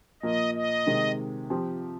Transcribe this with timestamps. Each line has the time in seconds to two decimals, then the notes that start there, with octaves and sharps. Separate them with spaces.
0.22 A#2 F3 A#3 D#5
0.54 D#5
0.87 C3 D#3 G#3
1.50 F3 C4 G4